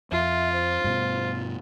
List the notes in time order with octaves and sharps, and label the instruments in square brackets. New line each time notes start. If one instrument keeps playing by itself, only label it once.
[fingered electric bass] F2 [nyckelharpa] F4 [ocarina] E5
[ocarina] C5
[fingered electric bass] G2 B2